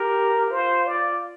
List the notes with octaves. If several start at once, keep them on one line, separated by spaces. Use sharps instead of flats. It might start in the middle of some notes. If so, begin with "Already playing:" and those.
Already playing: G4 A#4
F4 C5
D5